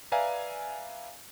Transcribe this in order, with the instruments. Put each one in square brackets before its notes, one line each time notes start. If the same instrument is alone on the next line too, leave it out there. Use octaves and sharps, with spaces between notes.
[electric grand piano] B4 D5 E5 F5 G#5 A#5